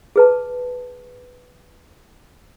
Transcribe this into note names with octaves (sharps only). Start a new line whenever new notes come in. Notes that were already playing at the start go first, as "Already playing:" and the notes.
G#4 B4 A5